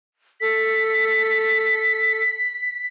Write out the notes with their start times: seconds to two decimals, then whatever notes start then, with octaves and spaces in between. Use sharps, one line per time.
0.41 A4 B6